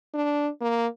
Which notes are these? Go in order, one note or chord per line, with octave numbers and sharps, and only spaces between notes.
D4
A#3